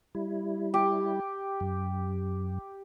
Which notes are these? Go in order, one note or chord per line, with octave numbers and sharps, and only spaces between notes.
G3 E4
G4
F#2